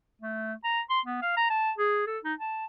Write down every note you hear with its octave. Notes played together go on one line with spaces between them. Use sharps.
A3
A#5
C6
B3
F5
A#5
A5
G#4
A4
D#4
A5